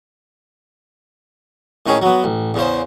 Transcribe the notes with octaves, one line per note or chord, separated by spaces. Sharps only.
A2 D#3 C#4 G#4
F#3 B3
A1
E2 C#3 C5